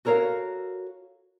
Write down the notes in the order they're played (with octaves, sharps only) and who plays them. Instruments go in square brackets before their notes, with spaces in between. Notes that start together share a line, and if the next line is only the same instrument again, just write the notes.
[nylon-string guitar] F#4 A4 A#4 C#5 F5